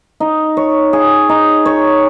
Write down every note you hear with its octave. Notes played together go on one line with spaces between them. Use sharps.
D#4
C#5
G#4
D#4
C#5